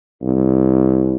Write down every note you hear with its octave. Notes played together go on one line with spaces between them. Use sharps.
C2